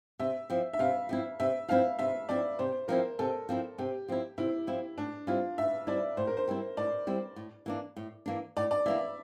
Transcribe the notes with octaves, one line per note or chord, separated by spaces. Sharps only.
C3 E5
F3 C4 E4
E5
C3 F5
F3 C4 E4
C3 E5
F3 C4 E4 F5
C3 E5
F3 C4 E4 D5
C3 C5
F3 C4 E4 A#4
C3 A4
F3 C4 E4
C3 G4
F3 C4 E4
C3 E4
F3 C4 E4
A2 D4
G3 C4 E4 F4
A2 E5
G3 C4 E4 D5
A2 C5
A#4
C5
G3 C4 E4
A2 D5
G3 C4 E4
A2
E3 A#3 D4
A2
E3 A#3 D4
A2 D5
D5
E3 A#3 D4 E5